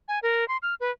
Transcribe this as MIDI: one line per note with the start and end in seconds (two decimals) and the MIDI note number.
0.08 0.19 80
0.23 0.47 70
0.48 0.57 84
0.62 0.75 89
0.80 0.91 71